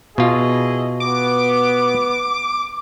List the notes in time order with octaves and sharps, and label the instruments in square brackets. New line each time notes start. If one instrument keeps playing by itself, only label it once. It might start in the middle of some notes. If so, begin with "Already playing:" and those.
[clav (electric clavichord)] B2 F4 [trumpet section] E4 G#4 D#5
[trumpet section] B3 [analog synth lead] D6